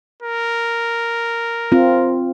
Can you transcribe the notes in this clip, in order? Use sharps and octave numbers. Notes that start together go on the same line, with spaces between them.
A#4
C4 F4